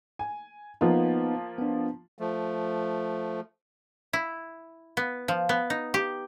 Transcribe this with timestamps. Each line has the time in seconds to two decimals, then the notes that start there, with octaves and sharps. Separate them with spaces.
0.19 G#5
0.81 F3 A#3 B3 D#4 F4
1.59 B3 D4
2.18 F3 A3
4.13 E4
4.97 B3
5.28 F3
5.49 B3
5.70 D#4
5.94 G4